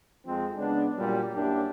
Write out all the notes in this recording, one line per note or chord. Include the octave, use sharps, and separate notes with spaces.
F2 F3 G#3 C4
C#3 G#3 B3 D4
A#2 F#3 G3
F#2 A#3 D4 E4 G4